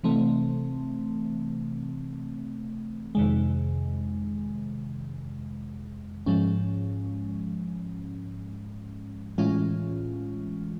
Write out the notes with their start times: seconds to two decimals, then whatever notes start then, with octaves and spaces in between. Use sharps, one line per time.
0.04 C3 E3 A3 C4
3.15 F2 C3 D#3 G#3
6.26 G#2 F3 G#3 C#4
9.38 A2 E3 G#3 C#4 F4